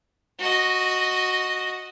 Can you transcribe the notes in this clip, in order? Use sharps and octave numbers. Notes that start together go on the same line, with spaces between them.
F#4 D#5